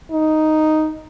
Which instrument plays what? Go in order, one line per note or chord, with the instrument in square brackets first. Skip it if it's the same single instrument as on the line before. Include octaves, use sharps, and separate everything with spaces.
[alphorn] D#4